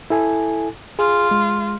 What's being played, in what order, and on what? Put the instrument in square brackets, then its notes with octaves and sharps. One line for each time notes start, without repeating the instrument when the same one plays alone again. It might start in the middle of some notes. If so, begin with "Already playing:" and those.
[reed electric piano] E4 A4 G#5
[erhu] F4 [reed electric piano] G#4
[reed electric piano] G#3